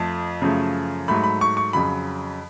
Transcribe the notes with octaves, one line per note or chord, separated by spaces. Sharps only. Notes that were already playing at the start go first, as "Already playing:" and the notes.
Already playing: F2 F3 A3 A5
F#2 C#3 F3 A3
G#2 F#3 A3 B5
B5
C#6
C#6
F2 C#3 F#3 B5